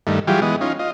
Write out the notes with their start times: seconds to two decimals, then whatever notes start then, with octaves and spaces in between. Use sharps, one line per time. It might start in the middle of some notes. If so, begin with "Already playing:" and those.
0.07 G2 D#3 A3
0.27 E3 F#3 G3 F4 G4 G#4
0.42 E3 G#3 B3 D#5
0.61 C#4 D#4 F4
0.79 F4 D#5